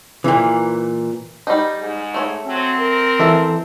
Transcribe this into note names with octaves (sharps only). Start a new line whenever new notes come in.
A#2 E3
G3 D#4
G#2
A3 C#5
F#3 C4
A#4
E3 A4 E5